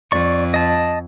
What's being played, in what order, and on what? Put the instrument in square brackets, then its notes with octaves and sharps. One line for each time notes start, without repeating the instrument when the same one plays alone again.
[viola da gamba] F2 [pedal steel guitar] D5 C#6
[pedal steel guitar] D#5 A5